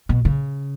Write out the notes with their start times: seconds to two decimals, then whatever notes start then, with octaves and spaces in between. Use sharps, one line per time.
0.09 B2
0.25 C#3